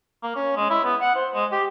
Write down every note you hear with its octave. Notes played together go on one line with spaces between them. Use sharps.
A#3
C#4
G#3
E4
B3
F#5
C5
G#3
G4